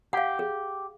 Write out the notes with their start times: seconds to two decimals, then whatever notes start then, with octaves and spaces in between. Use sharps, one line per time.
0.13 G4 F5 F#5
0.39 G#4